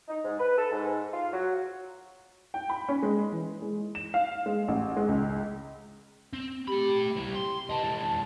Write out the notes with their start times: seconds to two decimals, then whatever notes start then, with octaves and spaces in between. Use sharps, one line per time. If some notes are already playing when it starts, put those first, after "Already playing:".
0.08 D#4
0.24 G#2
0.38 B4
0.57 A4
0.71 G#2
1.13 F4
1.32 F#3
2.54 G5
2.70 B5
2.89 C#4
3.03 G#3
3.32 E3
3.62 G#3
3.95 E7
4.14 F5
4.46 G#3
4.68 A1
4.97 G#3
5.08 C#2
6.33 C4
6.67 A3 G4 B5
7.17 C4 E4
7.35 C6
7.70 B4 D#5 A5
7.83 G#3 E4